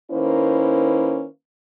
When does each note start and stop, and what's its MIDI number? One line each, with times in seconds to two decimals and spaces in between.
0.12 1.26 51
0.12 1.26 58
0.12 1.26 61
0.12 1.26 64
0.12 1.26 71
0.12 1.26 72